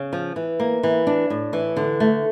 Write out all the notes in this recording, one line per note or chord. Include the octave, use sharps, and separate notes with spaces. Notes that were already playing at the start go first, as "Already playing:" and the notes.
Already playing: C#3
F3
E3
A#3
E3
D4
A2
E3
D3
A3